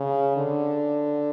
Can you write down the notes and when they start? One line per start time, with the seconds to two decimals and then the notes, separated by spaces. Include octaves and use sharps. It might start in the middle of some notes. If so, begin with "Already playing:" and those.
Already playing: C#3
0.36 D3